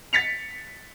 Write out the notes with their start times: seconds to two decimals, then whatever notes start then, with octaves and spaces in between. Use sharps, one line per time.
0.13 A6 B6 C#7 F7